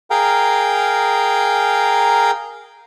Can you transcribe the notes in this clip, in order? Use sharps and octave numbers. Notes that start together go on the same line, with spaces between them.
G#4 A#4 F5 G5 A#5